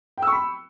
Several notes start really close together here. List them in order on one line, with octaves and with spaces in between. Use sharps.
G5 E6 C#6 B5